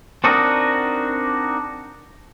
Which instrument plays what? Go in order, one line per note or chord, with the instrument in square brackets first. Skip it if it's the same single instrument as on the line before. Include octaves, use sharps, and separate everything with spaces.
[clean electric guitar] C4 D4 D#4 F#4 A#4 D#5